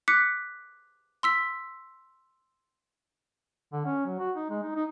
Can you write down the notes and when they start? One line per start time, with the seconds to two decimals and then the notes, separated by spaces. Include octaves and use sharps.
0.08 D6 F#6 B6 C#7
1.23 C6 E6 B6
3.73 D3
3.86 C#4
4.06 F#3
4.19 F#4
4.36 D#4
4.49 G#3
4.63 D#4
4.76 D#4